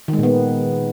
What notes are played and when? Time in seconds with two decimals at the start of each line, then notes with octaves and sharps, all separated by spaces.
0.08 D#3
0.13 G#3
0.18 A#2
0.23 B3